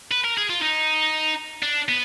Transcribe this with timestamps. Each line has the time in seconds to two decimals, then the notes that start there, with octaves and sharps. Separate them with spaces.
0.11 B4
0.24 A#4
0.37 G#4
0.50 F4
0.62 D#4
1.63 D4
1.89 B3